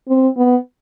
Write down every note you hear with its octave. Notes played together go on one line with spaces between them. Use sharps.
C4
B3